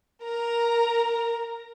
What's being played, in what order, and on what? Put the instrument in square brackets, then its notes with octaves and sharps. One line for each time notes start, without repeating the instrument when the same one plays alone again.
[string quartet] A#4 A#5